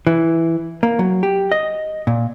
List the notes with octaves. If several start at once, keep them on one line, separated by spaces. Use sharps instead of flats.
E3
A#3
F#3
G4
D#5
A#2